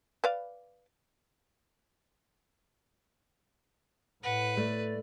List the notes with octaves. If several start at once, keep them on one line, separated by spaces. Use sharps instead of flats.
B4 D5 F5
A2 B4 F#5
A3 D5